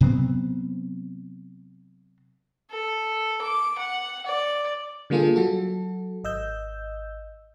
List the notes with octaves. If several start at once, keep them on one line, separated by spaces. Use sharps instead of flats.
C3 F#3 B3 C4
A4
D6
F#5
D5
D3 G3 A#3 F4 G#4 A4
F#3 F#4 A4
G#1 D#5 E6 G6